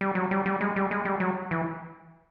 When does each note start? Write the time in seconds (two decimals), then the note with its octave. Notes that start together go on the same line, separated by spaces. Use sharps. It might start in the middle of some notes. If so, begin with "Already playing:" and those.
0.01 G3
0.15 F#3
0.31 G3
0.46 G3
0.61 G#3
0.76 G3
0.91 G#3
1.05 G3
1.20 F#3
1.51 E3